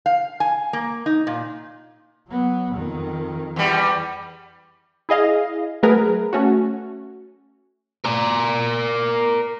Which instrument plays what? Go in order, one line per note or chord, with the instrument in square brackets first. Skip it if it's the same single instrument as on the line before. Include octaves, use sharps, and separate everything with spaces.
[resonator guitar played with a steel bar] F5
G#5
A#3
D#4
A#2
[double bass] F#3 B3
F2 D#3
[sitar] E2 G3
[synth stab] E4 G#4 D#5 F5
F#3 A3 G#4 A#4 B4
A3 C#4 F#4
[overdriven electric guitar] A#4 D5